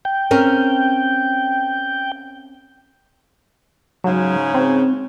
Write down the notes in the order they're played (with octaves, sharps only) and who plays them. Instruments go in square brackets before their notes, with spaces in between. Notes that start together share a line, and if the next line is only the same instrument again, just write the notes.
[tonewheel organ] G5
[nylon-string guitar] C4 C#4 A#4
[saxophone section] G#2 C#3 [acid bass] F#3
[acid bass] C4